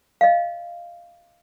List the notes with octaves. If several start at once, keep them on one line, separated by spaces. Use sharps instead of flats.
D#5 F5